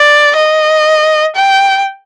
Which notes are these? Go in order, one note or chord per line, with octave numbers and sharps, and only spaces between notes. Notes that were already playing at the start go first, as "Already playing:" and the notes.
Already playing: D5
D#5
G5